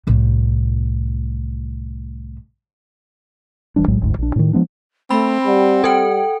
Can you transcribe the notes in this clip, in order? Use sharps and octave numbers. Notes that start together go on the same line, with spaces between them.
C2 A2
E1 E3 G3 D4
B1 A2 F#3 G#3
F#1 D2 G#2
A#1 D4
A2 D#3
F3 G#3 B3 D4
A3 C4 B5
G3 F#5
G3 A4 G5